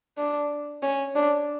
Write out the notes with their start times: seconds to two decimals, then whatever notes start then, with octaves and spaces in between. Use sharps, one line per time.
0.18 D4
0.83 C#4
1.16 D4